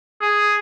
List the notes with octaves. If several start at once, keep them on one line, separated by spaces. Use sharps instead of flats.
G#4